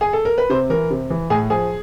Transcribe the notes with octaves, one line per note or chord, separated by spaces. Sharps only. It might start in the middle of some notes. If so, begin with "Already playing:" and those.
G#4
A4
A#4
B4
C3 C5
E3 A#4
C3
E3
A2 G#4
F3 G#4